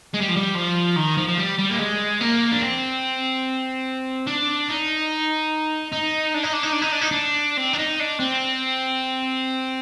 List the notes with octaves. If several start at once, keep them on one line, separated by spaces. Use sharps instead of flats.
G#3
G3
F3
G3
F3
D#3
F3
F3
G3
G3
A#3
G#3
A#3
D4
C4
D4
D#4
D#4
D4
D#4
D4
D#4
D4
D#4
D4
D#4
D4
C4
D4
D#4
D4
C4